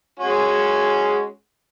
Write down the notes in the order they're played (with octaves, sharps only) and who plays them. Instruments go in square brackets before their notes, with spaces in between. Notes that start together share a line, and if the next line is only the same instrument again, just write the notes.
[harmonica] G#3 C#4 F#4